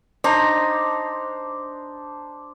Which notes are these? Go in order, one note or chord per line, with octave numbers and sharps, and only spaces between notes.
D4 D#4 C5 A#5